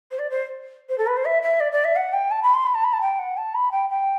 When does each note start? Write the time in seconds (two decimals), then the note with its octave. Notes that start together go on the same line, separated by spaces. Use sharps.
0.11 C5
0.18 D5
0.30 C5
0.89 C5
0.97 A4
1.07 B4
1.16 C5
1.25 E5
1.42 E5
1.60 D5
1.72 D5
1.84 E5
1.95 F#5
2.12 G5
2.30 A5
2.42 B5
2.54 C6
2.66 B5
2.74 A5
2.83 B5
2.93 A5
3.01 G5
3.18 F#5
3.37 A5
3.54 B5
3.71 G5
3.89 G5